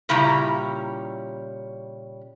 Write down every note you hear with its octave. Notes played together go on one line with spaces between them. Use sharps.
A#2 C#3 G3 C#4 E4 A#5